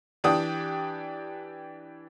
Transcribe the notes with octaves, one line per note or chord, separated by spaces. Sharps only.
E3 D4 G4 D#6